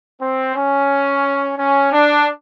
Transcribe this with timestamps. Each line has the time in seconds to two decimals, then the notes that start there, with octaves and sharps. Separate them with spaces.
0.21 C4
0.55 C#4
1.58 C#4
1.91 D4